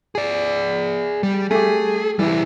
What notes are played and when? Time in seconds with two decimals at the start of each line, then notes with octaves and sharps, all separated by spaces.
0.15 G#4 D5
1.23 G3
1.51 A3 G4 G#4
2.19 E3 G3 E4